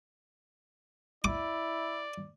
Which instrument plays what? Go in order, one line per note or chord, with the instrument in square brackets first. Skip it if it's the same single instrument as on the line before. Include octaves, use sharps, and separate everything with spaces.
[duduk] E4 [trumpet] D5 [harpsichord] D6